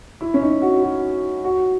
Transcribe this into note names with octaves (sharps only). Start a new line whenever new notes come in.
E4
C#4
D#4
F#4
F#4
F#4